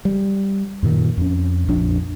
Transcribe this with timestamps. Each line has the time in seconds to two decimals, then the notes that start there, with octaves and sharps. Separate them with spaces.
0.05 G3
0.83 F#2 A#2 D#3
1.18 F2 C#4
1.68 A#1 F2 D4